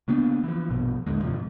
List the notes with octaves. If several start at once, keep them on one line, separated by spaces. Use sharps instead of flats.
C#3 A#3 B3 D4
E3 F3
A#1 G2 B2
A1 D#2 D3 G#3
A1 G2 C3 F3
G#2